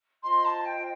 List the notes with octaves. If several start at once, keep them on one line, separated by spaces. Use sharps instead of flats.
F4 C5 D#5 C6
A5
G5